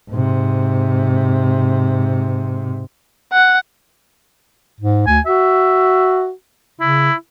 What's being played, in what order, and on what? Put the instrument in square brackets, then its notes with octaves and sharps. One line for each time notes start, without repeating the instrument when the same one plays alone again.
[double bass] G#2 C3
[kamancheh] F#5
[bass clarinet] G#2
[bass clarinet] D2 [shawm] G#5
[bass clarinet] F#4 [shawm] E5
[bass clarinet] C#3 [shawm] E4